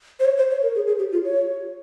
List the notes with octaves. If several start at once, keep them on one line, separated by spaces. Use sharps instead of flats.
C5
C#5
C5
C#5
A#4
G#4
G#4
G4
F4
C#5